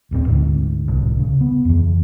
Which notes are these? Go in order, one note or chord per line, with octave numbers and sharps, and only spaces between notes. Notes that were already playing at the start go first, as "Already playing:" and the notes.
D#1 A1 C3 C4
D2 G#2 D3
D1 C2
C#3
B3
F2 E3